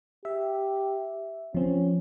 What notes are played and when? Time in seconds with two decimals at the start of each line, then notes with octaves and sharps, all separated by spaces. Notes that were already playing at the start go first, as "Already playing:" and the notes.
0.25 G4 E5
1.55 F3 C4 C#4